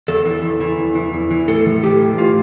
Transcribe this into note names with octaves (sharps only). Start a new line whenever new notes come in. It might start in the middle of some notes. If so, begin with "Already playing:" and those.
E2 A4
E3
E2
E3
E2
E3
E2
E3
A2 A4
E3
A2 G4
E3
A2 F4